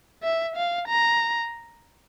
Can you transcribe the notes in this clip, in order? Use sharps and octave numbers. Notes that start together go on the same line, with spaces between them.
E5
F5
A#5